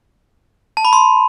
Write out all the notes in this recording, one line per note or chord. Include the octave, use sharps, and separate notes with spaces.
A5
B5
C6